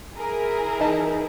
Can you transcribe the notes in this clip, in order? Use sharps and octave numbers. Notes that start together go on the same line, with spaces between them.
E4 G#4 A#4
E3 D#4 A5